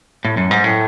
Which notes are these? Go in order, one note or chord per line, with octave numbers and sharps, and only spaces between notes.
A2
F#2
G#2
A2